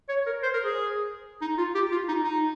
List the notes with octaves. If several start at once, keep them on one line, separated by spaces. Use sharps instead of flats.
C#5
A#4
C5
A#4
G#4
D#4
F4
G4
F4
D#4
D#4